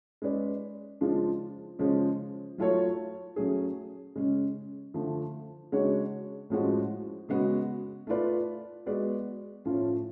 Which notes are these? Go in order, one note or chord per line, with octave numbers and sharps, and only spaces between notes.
G#3 C#4 G#4 B4 D5
C#3 F3 G#3 D4 F4
C#3 F3 G#3 C#4
F#3 A3 F4 A4 C#5
F#3 A3 C#4 G#4
C#3 G#3 C#4
D3 F3 A3
C#3 G#3 D4 F#4 C#5
A2 F3 G#3 C#4 F#4
C#3 G#3 B3 F#4 B4
A3 F4 B4 D5
G#3 B3 F#4 B4 D5
A2 F3 A3 C#4 F4